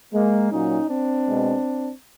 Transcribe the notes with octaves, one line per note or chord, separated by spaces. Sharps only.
G#3 A#3
A#2 F#3 C#4 D#4
C4 D4
B2 G#3